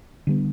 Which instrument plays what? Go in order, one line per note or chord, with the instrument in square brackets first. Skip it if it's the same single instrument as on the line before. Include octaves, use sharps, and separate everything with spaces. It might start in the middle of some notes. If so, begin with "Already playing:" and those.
[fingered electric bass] D3 G3 B3